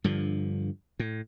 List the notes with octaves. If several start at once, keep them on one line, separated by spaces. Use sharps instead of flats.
G2 D3 F3
A2